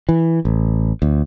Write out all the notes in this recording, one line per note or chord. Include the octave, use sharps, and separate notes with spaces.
E3
A1
D2